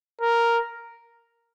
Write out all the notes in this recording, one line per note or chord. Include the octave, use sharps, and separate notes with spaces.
A#4